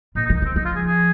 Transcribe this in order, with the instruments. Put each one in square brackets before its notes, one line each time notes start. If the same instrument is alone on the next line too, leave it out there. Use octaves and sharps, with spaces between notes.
[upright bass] A#2 [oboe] D#4
[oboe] D#4
[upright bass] D#3
[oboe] D#4
[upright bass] D#3 [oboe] C4
[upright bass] F3 [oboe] D#4
[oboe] F4
G#4
G#4